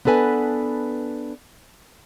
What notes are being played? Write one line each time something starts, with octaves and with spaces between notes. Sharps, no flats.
B3 D4 A4 B4 G#5